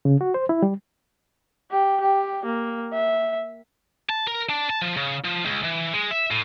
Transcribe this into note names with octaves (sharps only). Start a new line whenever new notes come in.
C#3
F#4
C5
E4
G3
G4
G4
A#3
E5
A5
A#4
D4
A5
F3
C#3
F3
C#2
E3
G#3
E5
A2